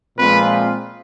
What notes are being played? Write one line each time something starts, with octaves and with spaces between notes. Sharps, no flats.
A#2 F3 G#3 C4 F4 B4